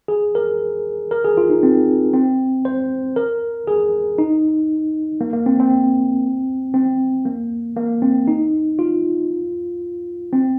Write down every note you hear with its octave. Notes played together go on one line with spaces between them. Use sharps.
G#4
A#4
A#4
G#4
F4
D#4
C4
C4
C5
A#4
G#4
D#4
A#3
A#3
C4
C4
C4
A#3
A#3
C4
D#4
F4
C4